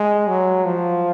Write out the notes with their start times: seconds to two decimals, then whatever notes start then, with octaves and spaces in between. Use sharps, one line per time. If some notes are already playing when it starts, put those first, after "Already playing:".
Already playing: G#3
0.28 F#3
0.64 F3